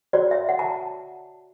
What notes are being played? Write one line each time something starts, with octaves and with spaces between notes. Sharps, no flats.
F#4 C#5 D5
E5
F#5
A5